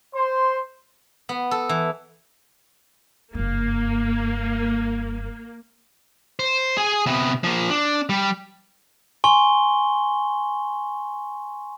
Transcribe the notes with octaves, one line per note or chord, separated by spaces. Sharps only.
C5 C6
B3
A4
E3
F#1 G2 A#3
C5
G#4 G#5
C3 B3
F3 A#3
D4
G3
G#5 C6 C#6 G7